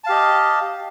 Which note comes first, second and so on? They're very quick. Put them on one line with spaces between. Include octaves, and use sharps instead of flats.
A5 F5 G4 D#5